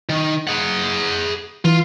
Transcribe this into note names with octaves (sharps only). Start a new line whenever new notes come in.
D#3
G#4 F#5
E3 F4